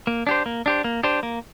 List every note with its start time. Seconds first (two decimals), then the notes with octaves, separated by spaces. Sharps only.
0.07 A#3
0.27 D4 G4 C5
0.46 A#3
0.66 D4 G4 C5
0.84 A#3
1.03 D4 G4 C5
1.23 A#3